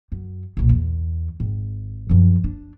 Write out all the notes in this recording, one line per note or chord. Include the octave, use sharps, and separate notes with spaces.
F#2
B1 A#2
E2
G#1
F#2 F3
D4